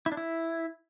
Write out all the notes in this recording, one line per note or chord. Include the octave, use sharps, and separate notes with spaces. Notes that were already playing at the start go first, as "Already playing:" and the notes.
E4
D4
E4